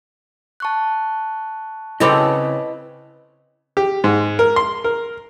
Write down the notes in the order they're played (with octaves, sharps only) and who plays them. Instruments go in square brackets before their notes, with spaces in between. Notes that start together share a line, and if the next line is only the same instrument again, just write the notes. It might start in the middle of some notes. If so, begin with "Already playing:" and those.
[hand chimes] A5 C#6 F#6
[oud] C#3 C4 A4 [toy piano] E4 B5 D6 [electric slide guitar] B4 D#5
[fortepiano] G4
G#2
A#4
C6
A#4